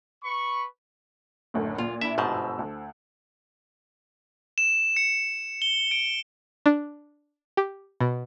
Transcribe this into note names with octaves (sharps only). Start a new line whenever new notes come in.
B4 B5 C#6
F#1 D2 A2
A#2 F4
D4 E4 E5
G1 G#2 B2 C5 A5
E6
D2
E7
C#7
G7
D7
D4
G4
B2